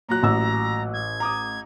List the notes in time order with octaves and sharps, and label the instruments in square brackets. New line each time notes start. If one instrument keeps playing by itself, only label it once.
[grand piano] A#2 F#3 F#6 [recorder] A#5
[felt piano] A1 E6
[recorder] G#6
[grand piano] A#5 D6 D#6